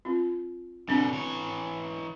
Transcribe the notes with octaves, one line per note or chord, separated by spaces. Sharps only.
C4 F4
B2 D3 C4 D4 G#5
E3 C#5